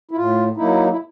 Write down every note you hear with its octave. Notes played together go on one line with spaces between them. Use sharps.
E4
A2 F4
F#3 A#3 D#4 E4
E4